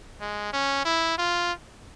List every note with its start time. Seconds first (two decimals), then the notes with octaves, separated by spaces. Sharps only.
0.21 G#3
0.53 C#4
0.85 E4
1.18 F4